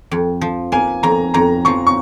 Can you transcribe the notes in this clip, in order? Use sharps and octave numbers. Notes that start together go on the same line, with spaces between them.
F2
F3
A#3 G#5
F2 A#5
F2 A#5
F3 C#6
C#6